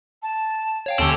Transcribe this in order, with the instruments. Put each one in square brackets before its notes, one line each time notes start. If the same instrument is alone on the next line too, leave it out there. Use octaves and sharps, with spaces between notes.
[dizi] A5
[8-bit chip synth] C#5 F5 G5
[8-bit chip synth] D#2 D3 [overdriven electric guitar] C4 G4 [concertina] C#4 A4 [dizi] G#5